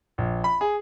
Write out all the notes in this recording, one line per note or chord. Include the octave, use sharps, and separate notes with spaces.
A#1
B5
G#4